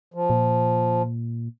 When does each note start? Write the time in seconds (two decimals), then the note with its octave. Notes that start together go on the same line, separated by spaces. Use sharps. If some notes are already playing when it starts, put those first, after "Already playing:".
0.14 F3
0.30 A#2